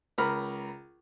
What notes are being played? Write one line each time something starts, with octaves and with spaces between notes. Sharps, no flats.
C#2 A#4 A#5 B5 F6